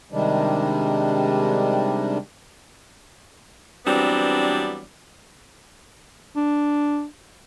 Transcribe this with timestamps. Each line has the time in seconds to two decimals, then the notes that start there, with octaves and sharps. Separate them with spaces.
0.12 C3 D#3 G3 G#3 D4
3.86 E3 F#3 G3 B3 C4 D4
6.36 D4